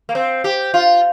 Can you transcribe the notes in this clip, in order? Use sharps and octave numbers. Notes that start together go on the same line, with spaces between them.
A#3
C4
G4
F4